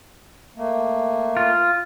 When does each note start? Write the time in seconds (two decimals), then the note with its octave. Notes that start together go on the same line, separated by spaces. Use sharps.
0.57 A3 A#3
1.37 F4